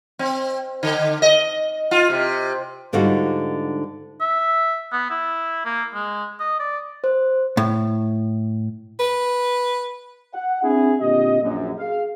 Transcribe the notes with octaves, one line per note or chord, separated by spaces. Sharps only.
C4
D3
D#5
F4
C3
G#2 D3 G3 D#4 F4 F#4
E5
B3
E4
A#3
G#3
D#5
D5
C5
A2
B4
F#5
C4 D4 E4 G#4
A#2 D3 C4 G4 D#5
A#1 F#2
G#4 F5